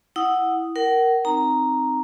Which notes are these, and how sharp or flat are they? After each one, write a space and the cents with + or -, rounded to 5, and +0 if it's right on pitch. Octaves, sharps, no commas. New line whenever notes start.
E4 +0 F#5 +0 D#6 +0
A#4 +0 F#5 +35
C4 +0 D#4 +0 A#5 +0